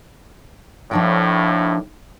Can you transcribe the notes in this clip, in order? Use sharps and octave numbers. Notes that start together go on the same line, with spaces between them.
D#2 A2 F3 D4 G5